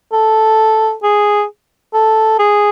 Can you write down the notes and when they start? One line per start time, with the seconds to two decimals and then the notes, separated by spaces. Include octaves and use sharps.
0.12 A4
1.03 G#4
1.93 A4
2.39 G#4